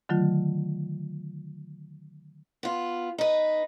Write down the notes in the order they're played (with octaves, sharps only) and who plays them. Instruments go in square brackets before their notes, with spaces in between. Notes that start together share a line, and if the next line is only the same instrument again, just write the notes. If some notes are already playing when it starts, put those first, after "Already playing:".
[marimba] D3 D#3 F#3 A3 F4
[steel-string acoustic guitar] B3 F4
D#4 B4